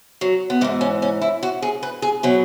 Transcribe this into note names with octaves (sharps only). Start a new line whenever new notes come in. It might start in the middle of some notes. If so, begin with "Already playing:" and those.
F#3
B3
G#2 E3 G#3
C#4
C#4
E4
F#4
G#4
B4
G#4
B2 F#3 B4